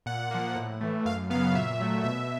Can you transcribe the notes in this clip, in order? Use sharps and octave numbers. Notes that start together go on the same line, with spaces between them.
A#2 F#5
F3 A#3
A2
E3 A3
F#2 F5
C#3 F#3 B3 F5
A#2 E5
F#3 A3
B2 E5